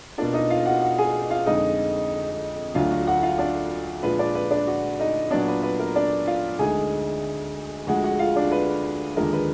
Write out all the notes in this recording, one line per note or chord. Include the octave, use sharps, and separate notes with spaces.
B2 A#3 D4 F4 D5
D#4 D#5
F4 F5
F#4 F#5
F#4 F#5
G#4 G#5
F4 F5
F2 D3 G#3 D#4 D#5
D2 D3 F#3 D4 F4 F5
F#4 F#5
F#4 F#5
F4 F5
D4 D5
A#2 F3 G#3 D4 F4 B4
D4 D5
B4
D4 D5
F#4 F#5
D#4 D#5
A#2 F#3 B3 D4 F4 D5
B4
B4
A#4
D4 D5
F4 F5
D2 D3 G#3 D#4 G#4 G#5
D2 D3 F3 G#3 F#4 F#5
F#4 F#5
F4 F5
D4 D5
B4
D#2 D3 F3 G#3 D4 A#4
B4